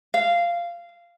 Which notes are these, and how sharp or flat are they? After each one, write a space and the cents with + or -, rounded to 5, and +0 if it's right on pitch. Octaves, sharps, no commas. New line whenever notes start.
F5 -15